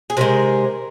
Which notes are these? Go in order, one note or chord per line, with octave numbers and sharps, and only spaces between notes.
G#4
C3 D#3 G#3 A#4